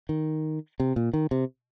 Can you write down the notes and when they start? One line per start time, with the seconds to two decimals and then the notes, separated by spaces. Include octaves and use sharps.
0.09 D#3
0.80 C3
0.96 A#2
1.14 D#3
1.31 C3